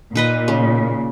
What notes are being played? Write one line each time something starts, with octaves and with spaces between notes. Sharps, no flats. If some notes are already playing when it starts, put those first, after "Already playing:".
A#2 D#4 B4 D#5
C#3